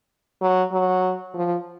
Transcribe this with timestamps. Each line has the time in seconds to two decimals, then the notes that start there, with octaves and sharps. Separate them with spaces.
0.42 F#3
0.72 F#3
1.34 F3